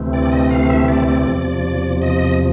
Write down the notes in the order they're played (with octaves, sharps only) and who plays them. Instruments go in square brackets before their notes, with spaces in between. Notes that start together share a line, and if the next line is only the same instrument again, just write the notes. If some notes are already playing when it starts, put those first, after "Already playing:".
Already playing: [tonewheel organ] D2 C3 E3 A3 C4
D5
D#5
F5
E5
D5
D5
E2 C3 F3
D#5